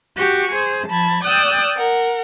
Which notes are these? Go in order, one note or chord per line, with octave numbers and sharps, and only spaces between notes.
F#4 G4 C#6
G#4 C5
F3 A5 B5 G#6
D5 G5 D#6 E6 F#6
A#4 F#5